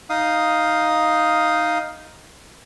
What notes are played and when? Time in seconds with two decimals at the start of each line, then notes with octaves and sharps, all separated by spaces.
0.10 D#4 F5 D#6